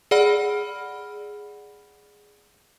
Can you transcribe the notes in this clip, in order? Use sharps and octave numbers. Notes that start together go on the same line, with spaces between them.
G#4 D5 F#5 B5 F6